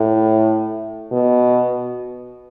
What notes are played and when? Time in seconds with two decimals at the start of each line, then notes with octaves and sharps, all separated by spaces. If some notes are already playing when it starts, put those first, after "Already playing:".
Already playing: A2
1.12 B2